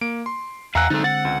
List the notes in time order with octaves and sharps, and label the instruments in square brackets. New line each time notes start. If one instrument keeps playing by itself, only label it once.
[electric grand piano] A#3 D7
C6
[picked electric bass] E2 [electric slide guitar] F5 F#5 G#5 [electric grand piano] A#5 E6 F#6
[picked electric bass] D3 G#3 C4 [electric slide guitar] D#4 A4 [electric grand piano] A6
[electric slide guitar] F#5 [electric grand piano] A6
[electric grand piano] C#2